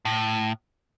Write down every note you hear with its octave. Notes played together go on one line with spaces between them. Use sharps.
A2